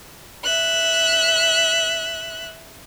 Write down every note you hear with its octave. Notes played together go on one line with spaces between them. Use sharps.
E5 F#6